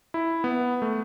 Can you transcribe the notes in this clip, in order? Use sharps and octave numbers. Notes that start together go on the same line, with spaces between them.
E4
B3
A3